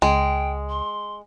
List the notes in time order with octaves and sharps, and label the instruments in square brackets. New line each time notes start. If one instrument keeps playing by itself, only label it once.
[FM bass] C#2 [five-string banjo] G#3 [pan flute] G5
[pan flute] C6